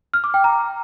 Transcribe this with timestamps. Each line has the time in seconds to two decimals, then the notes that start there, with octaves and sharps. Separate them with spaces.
0.14 F6
0.24 D6
0.34 G5
0.44 A#5